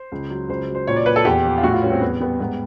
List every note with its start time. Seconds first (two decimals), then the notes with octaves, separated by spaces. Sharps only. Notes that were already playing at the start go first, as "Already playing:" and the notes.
Already playing: C5
0.12 C#2
0.30 F#3
0.49 C#2 C5
0.68 F#3
0.75 C5
0.87 A#2 C#5
0.96 D5
1.06 A#2 B4
1.16 A4
1.25 E2 G4
1.45 F3
1.58 F4
1.63 A2 F#4
1.73 F4
1.82 G3 C#4
1.92 C4
2.01 E2 B3
2.20 G3 B3
2.40 G#2 B3